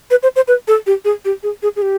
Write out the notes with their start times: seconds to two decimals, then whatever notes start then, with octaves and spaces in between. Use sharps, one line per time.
0.11 B4
0.23 C5
0.36 C5
0.48 B4
0.68 A4
0.87 G4
1.05 G#4
1.25 G4
1.43 G#4
1.63 G#4
1.76 G#4
1.82 G4